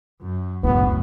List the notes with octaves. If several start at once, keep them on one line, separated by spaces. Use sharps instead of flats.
F#2
C#2 F#2 A2 B3 E4